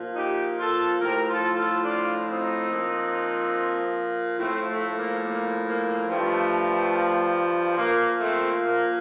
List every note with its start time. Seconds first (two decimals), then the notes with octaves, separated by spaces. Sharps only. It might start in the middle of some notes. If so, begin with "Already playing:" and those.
Already playing: A#2 F3
0.16 D#4 G4
0.59 F4 A4
1.01 A2 F3 G4 A#4
1.29 F4 A4
1.57 F4 A4
1.85 D4 F4
2.28 C4 D#4
2.71 A#2 F3
4.39 A2 F3 A3 C4
4.68 A3
4.96 A#3
5.23 A#3
5.67 A#3
6.08 G2 F3 A3
7.77 A#2 F3 A#3
8.21 A3 C4
8.62 A#3